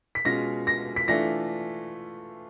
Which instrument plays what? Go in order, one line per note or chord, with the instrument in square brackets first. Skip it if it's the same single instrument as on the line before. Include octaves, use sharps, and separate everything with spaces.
[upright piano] B6
B2 G#3 C#4 F4 A#6
A#6
B6
E3 A3 D4 F4 A#6